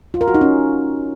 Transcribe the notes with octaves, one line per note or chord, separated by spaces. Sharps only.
F4
A#4
F#4
D#4
C#4